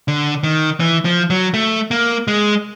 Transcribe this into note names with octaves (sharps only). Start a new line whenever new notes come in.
D3
D#3
E3
F3
F#3
A3
A#3
G#3